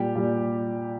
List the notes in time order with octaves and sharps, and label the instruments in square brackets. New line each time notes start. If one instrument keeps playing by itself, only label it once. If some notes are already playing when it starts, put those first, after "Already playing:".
Already playing: [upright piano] A#2 G3 G4
A#2 G3